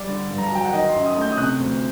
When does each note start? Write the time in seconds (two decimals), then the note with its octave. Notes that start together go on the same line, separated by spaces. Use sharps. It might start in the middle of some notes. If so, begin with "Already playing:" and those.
Already playing: G3 D5
0.09 D3
0.31 G2
0.38 A#5
0.46 A5
0.52 F#3 G5
0.65 F#5
0.73 D#3 D#5
0.89 C6
0.95 F#2
1.06 D#6
1.17 A3 G6
1.32 D#6
1.38 C3 F#6
1.60 D2